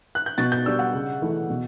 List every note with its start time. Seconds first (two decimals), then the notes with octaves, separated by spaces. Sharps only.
0.15 F#6
0.26 G6
0.38 B2 A6
0.52 G6
0.66 G3 D4 E6
0.79 F#5
0.93 C#3
1.22 E3 A3 E4
1.50 B2